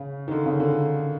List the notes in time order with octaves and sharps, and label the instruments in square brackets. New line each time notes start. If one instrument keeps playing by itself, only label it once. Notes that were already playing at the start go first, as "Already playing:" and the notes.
Already playing: [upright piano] C#3
D#3
D3
C#3
D3